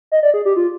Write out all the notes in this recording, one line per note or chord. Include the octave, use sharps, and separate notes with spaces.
D#5
D5
G#4
G4
F4